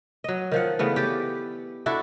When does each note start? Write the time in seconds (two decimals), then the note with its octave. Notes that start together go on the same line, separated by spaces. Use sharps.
0.24 F#3 D#5
0.52 D#3 F3 F#5
0.79 C#3 E3 A3 B3
0.96 G4 D5
1.86 D4 E4 F#4 A4